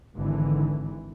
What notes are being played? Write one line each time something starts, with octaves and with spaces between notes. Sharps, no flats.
G#1 D3 E3